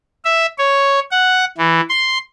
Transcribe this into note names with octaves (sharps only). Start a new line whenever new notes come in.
E5
C#5
F#5
E3
C6